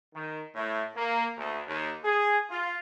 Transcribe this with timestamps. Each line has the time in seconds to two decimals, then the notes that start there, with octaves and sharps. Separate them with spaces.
0.14 D#3
0.55 A2
0.95 A#3
1.37 D2
1.67 D#2
2.04 G#4
2.50 F4